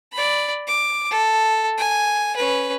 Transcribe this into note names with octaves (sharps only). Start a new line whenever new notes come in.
D5 B5
D6
A4
G#5
C#4 B4